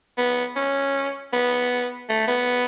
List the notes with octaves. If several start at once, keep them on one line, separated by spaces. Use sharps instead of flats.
B3
C#4
B3
A3
B3